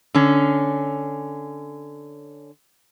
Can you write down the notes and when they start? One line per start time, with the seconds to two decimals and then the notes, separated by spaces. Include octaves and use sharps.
0.15 D3 C#4